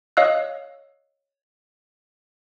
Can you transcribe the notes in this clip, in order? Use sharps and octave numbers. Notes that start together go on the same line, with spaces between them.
C#5 D#5 F5 E6 F#6